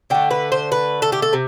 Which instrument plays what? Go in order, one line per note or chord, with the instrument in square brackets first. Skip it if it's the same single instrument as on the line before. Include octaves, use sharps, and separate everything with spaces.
[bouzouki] D3 A3 G5
B4
C5
B4
A4
G4
A4
C3